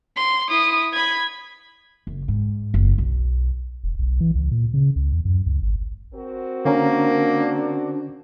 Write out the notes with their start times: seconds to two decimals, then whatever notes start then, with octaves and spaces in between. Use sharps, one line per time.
0.16 C6
0.49 E4 D#6
0.93 B5 G#6
2.07 F#1
2.28 G#2
2.74 F#1
2.98 B1
3.84 E1
3.99 B1
4.21 E3
4.35 C#2
4.51 A#2
4.74 C#3
4.96 C#2
5.12 E2
5.25 F#2
5.46 C#2
5.62 G#1
6.14 C4 F#4 A#4
6.65 D3 A#3 C#4 D4 A#5